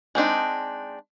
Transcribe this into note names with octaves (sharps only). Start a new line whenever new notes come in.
G#3 C4 D4 D#4